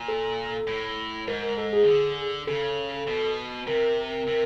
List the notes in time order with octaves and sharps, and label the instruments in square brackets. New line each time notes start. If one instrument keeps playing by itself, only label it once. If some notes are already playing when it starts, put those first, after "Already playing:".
Already playing: [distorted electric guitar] A#2
[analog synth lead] A4
[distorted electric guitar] A2
[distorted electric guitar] G#2 [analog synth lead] A#4
[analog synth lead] A#4
A4
G#4
[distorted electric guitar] D#3
D3
[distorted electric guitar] C#3 [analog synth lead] A4
[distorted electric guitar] B2
[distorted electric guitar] C3 [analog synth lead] A#4
[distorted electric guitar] C3